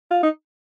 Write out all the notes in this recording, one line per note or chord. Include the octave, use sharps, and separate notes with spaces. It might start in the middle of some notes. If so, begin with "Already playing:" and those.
F4
D#4